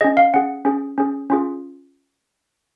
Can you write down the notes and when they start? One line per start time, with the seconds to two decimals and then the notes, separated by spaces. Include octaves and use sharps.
0.01 C#4 G#4 D#5
0.17 F5
0.34 C#4 G#4 F#5
0.65 C#4 G#4
0.98 C#4 G#4
1.30 C#4 F4 G#4